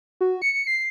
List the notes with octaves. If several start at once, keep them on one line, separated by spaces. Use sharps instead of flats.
F#4
C#7
C7